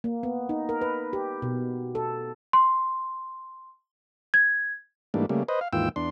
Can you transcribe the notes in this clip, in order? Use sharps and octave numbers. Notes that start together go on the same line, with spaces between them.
A#3
B3
D#4
A#4
B4
G4
B2
A4
C6
G#6
G#2 E3 G3 A3 A#3 D4
C#3 G3 A3 A#3
B4 C5 D#5
F5
D#2 G#2 E3 F4 G5 E6
E2 D4 C6